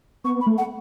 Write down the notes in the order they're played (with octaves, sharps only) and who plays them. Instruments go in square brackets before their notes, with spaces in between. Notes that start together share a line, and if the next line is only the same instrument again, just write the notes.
[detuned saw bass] B3 [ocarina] C#6
[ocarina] B5
[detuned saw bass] A3
[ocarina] F#5